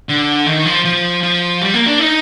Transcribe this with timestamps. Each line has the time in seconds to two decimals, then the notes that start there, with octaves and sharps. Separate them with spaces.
0.09 D3
0.46 D#3
0.65 F3
0.85 F3
1.23 F3
1.62 G3
1.74 A#3
1.86 D4
2.00 D#4